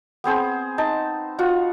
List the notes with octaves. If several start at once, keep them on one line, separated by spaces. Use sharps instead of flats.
B3 C4 G#4 C5
D#4 A5
F4 F#4 C#5 F#5